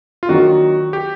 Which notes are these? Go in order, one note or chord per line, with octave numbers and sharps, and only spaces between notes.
F4
D#3 F#3 A#3 D4 F#4
G4